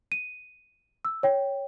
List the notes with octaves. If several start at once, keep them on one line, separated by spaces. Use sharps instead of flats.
D#7
E6
C#5 G5